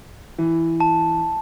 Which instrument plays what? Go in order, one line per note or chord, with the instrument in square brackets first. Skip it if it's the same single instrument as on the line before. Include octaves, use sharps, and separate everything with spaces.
[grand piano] E3
[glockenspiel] A5